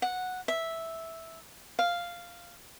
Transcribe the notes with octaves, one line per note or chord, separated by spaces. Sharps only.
F#5
E5
F5